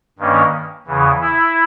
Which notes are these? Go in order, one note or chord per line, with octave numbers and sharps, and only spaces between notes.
G2 D#3 A#3 C#4
E2 C#3 E3
E4